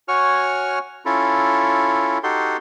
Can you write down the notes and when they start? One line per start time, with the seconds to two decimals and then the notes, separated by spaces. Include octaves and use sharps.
0.08 F#4 C#5 G#5 C#6 F6
1.05 C#4 E4 F4 A4
2.23 D#4 F#4 G4 A4 C6